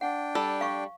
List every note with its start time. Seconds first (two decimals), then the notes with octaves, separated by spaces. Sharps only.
0.01 D4 F#5 G5
0.35 G3 A4
0.61 F5 C#6